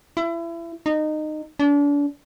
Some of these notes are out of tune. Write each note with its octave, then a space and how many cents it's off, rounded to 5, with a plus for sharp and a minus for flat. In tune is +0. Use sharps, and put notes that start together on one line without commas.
E4 +30
D#4 -20
D4 -35